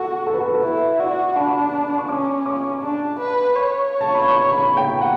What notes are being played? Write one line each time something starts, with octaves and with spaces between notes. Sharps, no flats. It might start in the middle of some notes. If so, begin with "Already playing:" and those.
Already playing: F#4 A4
A4
B4
A4
B4
A4
E4 B4
F#4 D5
D4 B5
C#6
C#4 D6
D6
D4
B4
C#5
A5
B5
C#6
B5
G5
F#5